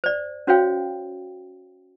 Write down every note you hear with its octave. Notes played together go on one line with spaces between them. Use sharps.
C5 D5
C#4 F#4 C5 C#5 F5 G5